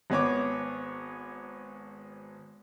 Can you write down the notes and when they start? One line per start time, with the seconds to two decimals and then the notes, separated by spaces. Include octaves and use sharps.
0.10 G#1 B3 C#5 D6